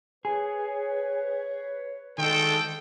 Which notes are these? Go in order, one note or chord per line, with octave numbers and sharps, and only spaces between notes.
G#4 B4 C#5
D2 D#3 G#3 A4 G5